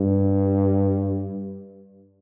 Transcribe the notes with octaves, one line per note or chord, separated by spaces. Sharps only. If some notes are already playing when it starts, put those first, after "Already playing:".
Already playing: G2